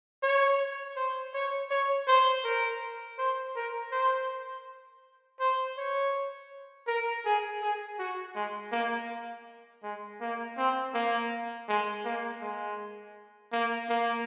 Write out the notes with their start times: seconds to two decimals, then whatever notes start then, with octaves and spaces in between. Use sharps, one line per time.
0.23 C#5
0.96 C5
1.34 C#5
1.71 C#5
2.07 C5
2.44 A#4
3.18 C5
3.56 A#4
3.92 C5
5.40 C5
5.77 C#5
6.87 A#4
7.25 G#4
7.62 G#4
7.99 F#4
8.35 G#3
8.72 A#3
9.83 G#3
10.21 A#3
10.57 C4
10.94 A#3
11.69 G#3
12.04 A#3
12.41 G#3
13.52 A#3
13.89 A#3